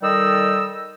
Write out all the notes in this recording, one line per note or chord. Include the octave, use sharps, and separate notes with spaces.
D#3 G3 A4 D#5 G5 E6